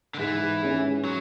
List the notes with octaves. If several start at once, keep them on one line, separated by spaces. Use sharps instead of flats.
D3
G#2 E3
G#3 C#4 G#4
F#3